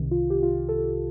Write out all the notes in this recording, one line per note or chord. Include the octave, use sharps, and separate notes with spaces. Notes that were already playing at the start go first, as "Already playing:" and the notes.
Already playing: C2 C3 D#3
F4
G4
F4
A4